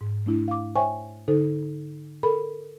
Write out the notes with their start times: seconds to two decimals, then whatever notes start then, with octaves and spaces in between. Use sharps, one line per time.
0.01 G#2
0.26 A3 D4 E4
0.48 F5 D6
0.76 C5 C#5 E5 G5 G#5 C#6
1.28 D3 D#4 A4 C5
2.23 A4 A#4 B5